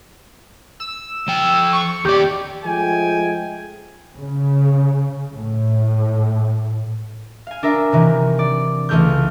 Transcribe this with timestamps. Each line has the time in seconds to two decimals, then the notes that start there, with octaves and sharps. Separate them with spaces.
0.80 E6
1.28 F3 G5
1.73 C#6
2.05 D#2 G4 D5
2.64 F3 G#3 A3 G5 G#5
4.19 C#3
5.33 A2
7.47 F5 G#5
7.63 D4 A#4 E5
7.92 C3 D#3 E3
8.39 D5
8.89 C#2 E3 A3 F6 G6